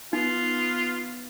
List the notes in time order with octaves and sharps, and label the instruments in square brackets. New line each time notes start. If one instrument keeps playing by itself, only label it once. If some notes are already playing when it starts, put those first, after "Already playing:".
[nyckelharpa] B3 [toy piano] D#4 [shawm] F4